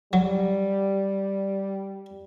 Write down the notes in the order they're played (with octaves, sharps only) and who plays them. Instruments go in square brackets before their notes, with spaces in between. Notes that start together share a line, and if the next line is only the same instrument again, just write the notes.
[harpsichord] F#3 [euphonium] G3